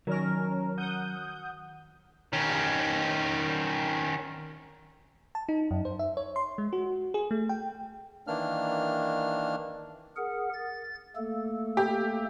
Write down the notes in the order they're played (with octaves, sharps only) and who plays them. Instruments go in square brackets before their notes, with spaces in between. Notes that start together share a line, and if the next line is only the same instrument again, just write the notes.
[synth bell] D#3 F6 [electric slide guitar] F#3 [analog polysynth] C#4 A#4
[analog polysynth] F#5 D#6 G6
[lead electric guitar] D#3 C#4
[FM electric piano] A5
D#4
F#2
C5
E5
C#5
C6
G#3
F#4
G#4
A3
G5
[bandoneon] D#3 E3 A#3 D4 F6
[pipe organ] G#4 A#4 F#5
A6
A3 A#3 A4
[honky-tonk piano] G4